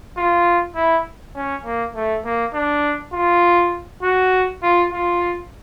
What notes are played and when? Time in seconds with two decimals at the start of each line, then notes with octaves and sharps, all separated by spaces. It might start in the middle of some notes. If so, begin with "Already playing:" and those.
0.17 F4
0.76 E4
1.36 C#4
1.65 A#3
1.95 A3
2.25 A#3
2.54 D4
3.13 F4
4.03 F#4
4.63 F4
4.92 F4